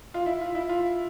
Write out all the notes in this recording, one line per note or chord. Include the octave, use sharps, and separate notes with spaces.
F4
E4
F4
E4
F4